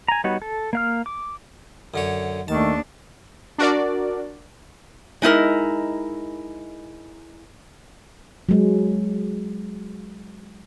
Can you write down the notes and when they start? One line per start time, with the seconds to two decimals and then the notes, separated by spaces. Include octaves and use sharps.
0.08 G#5 A#5
0.24 G3 B3 D#4 F#4 C#5
0.42 A4
0.73 A#3 F5 F6
1.06 D6
1.94 F#2 D3 C#5
2.48 D#2 D#3 A3 D4 A5
3.58 D4 F#4 A#4 D5
5.22 G#3 D#4 E4 A#4
8.49 F#3 G#3